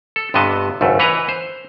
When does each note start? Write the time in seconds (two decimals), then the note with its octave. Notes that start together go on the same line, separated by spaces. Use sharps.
0.16 A4
0.34 G1 G2 C3 B3 D#5 A5
0.81 G#1 C#2 F#2 A3
0.99 E3 B4 C#5 D#5 A#5
1.29 C5